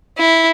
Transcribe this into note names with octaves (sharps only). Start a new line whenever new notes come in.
E4